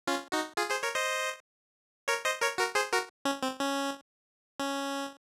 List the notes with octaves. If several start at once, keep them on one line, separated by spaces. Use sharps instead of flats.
C#4 F4
D#4 F#4
F4 G#4
G#4 C5
A#4 C#5
C5 D#5
A#4 C#5
C5 D#5
A#4 C#5
F#4 A#4
G#4 C5
F#4 A#4
C#4
C4
C#4
C#4